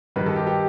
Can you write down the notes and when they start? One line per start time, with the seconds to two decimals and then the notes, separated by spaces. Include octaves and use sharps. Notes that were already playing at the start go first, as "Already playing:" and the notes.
0.16 G2 D#3 G3 B4
0.26 A4
0.36 G4
0.47 G4